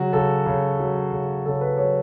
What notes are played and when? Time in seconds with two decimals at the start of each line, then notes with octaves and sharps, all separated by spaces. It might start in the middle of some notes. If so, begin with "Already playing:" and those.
Already playing: C#3 F#3 F#4
0.13 C#3 A4
0.46 C#3
0.80 F#3
1.12 C#3
1.45 C#3 A4
1.61 B4
1.78 F#3 C#5